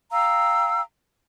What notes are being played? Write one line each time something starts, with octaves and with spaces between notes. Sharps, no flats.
F5 G5 A#5 E6